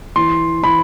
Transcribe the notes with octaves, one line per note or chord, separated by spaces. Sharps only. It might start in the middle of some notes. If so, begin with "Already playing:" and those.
E3 C6
E3 B5